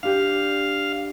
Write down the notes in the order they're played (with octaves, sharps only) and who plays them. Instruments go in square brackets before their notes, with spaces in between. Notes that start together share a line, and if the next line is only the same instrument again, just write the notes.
[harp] D4 G4 [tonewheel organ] F5